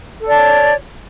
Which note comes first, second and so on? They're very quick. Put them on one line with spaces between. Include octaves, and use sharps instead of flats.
A4 D5 A5 C#5